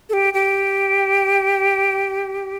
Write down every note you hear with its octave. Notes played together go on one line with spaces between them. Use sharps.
A4
G4
G4